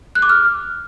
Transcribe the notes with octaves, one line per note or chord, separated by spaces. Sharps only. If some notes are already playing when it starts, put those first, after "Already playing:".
F#6
D6
F6